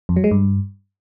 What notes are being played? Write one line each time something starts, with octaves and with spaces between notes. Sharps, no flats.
F2
F#3
G#3
G2